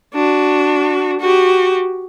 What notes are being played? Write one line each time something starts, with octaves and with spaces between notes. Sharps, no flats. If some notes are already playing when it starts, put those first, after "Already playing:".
D4 F#4
F#4 G4